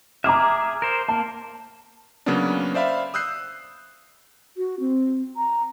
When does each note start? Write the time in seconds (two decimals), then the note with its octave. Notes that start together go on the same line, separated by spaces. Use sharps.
0.24 G#4 E5 A#5 D6 F6
0.82 A#4 C5
1.08 A#3 A5
2.26 C#3 F#3 A#3 B3 C#4 D4
2.74 C5 D5 E5 F5 B5
3.14 D#6 E6 F#6 G6 C7
4.57 F#4
4.80 C4
5.37 A#5